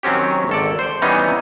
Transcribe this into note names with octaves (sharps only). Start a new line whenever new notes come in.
D#3 F#3 C4 C#4 G4
G#1 A4 D5
C5
E3 G3 B3 C#4 D#4